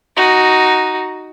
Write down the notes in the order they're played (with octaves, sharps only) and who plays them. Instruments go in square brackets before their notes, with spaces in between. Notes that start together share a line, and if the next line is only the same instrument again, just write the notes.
[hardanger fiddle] D#4 F#4